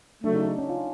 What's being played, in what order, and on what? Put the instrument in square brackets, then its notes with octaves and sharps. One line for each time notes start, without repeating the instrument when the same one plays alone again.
[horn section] C#3 F#3 A3 [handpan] D4
[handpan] D#4
D4
C#4
F4